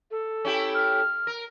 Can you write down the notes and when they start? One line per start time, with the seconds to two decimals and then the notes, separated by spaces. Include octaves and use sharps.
0.11 A4
0.45 C#4 E4 G4
0.74 F6
1.27 A#4